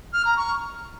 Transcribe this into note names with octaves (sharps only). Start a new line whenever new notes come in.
F6
A#5
C#6